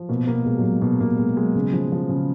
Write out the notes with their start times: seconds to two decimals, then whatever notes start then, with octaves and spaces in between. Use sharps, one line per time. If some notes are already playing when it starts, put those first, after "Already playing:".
Already playing: F3
0.09 B2 A#3
0.27 B2 A#3
0.46 B2 G#3
0.58 F#3
0.63 B2 G#3
0.81 B2 A#3
1.01 B2 A#3
1.18 B2 G#3
1.37 F#3 G#3
1.55 C#3
1.73 F3
1.92 F3
2.09 C#3